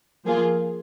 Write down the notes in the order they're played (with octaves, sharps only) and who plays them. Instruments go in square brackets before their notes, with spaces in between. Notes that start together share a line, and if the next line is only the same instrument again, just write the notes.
[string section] F3 A#3 F4 G#4